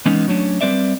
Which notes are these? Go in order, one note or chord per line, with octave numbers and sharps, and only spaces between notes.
E3 G#3 B3 C#4 D#4
F#3 A3 C#4 D4
G3 C4 B4 D5 E5